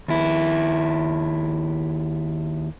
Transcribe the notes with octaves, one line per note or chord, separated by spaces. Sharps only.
D#2 E4